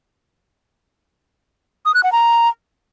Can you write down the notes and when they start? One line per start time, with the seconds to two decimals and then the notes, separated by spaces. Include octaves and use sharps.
1.86 D#6
1.94 F#6
2.03 F#5
2.12 A#5